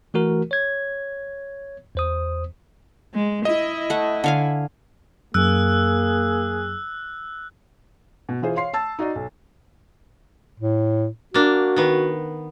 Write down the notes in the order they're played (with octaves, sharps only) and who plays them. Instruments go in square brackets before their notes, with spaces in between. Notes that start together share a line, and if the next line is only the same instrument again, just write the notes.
[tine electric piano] E3 A3 F#4 A#4
C#5 G#6
E2 C5 D#6
[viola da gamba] G#3
[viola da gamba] E4 [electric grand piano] D#5
[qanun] A3 F#5
D3 F5 G#5
[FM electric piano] F#2 [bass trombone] A#3 [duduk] G#4 [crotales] E6 F#6
[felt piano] B2
E3 F4 G#4 C5
C#5 F5 C6 C7
A5 E6 A6
D#4 F#4 D5 D#5
B1
[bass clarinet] A2
[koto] A#3 D4 [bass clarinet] F#4
[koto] D#3 B3